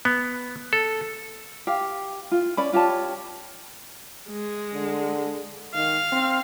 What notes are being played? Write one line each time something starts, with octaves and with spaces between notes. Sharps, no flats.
B3
A4
G4 F5
F4
C#4 D5 B5
F4 G4 C#5 A5
G#3
D3
D#3 F5
C4